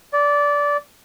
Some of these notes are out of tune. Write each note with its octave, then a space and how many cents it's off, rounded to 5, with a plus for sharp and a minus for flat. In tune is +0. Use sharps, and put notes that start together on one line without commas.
D5 -20